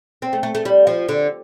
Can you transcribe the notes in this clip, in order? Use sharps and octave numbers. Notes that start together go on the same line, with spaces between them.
C4
A3
A3
A3
G3
F3
D3